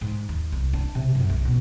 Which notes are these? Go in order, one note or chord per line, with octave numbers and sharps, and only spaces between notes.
G#2
D#2
C2
D4
C3
F#2
C2
B2